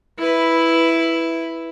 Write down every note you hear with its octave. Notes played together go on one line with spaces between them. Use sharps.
E4 B4